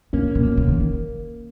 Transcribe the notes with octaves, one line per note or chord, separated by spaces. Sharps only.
A#2 A#3 C#4
A#3
B2
A#3
C#3
D#3